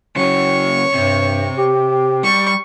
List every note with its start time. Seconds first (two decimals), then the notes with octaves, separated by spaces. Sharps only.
0.16 C#3 F#3 C#5 C#6
0.94 G2 C3
1.57 G4
2.23 G3 C#6